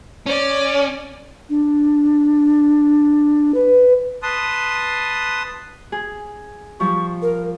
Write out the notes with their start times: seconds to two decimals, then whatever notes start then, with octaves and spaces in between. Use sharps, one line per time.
0.26 C#4 D5
1.50 D4
3.54 B4
4.23 B4 A5 C6 D#6
5.92 G#4
6.80 F3 G3 C#6
7.22 A#4